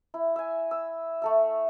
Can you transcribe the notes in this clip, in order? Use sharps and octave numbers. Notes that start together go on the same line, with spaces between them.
E4
E5 G#5
E6
A3 A4 E5